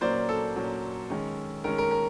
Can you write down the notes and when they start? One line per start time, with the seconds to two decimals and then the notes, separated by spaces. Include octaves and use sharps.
0.01 A#2 F#3 A#3 C#4 C5 D5
0.29 A4
0.56 A#2 F#3 A#3 C#4
1.10 D#3 G#3 C#4
1.64 D#3 G#3 C#4 A#4
1.78 A#4
1.91 A#4